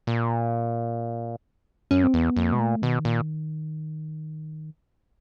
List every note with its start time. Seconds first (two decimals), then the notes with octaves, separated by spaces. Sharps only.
0.07 A#2
1.91 F#2 C#4
2.04 C4
2.14 E2 B3
2.37 F2 A#3
2.52 B2 G#3
2.59 A#2 A3
2.82 B2 D#3
3.05 A#2